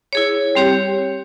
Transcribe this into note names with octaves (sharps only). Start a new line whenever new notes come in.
E4 G#4 C#5
G3 C4 G4 C#5